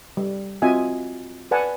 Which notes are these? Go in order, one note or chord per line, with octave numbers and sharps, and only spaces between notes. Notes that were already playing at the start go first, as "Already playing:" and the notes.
G3
C4 F4 F#4 D#5 E5 G#5
B4 D5 F#5 G#5 A5